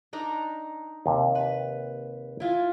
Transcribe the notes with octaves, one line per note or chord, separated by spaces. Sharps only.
D4 D#4 A#5
D#2 C3
B4
E4 F4 G#5